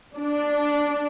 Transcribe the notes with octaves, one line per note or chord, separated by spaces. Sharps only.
D4